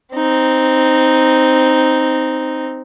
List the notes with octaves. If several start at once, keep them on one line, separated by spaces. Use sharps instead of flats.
C4 D#4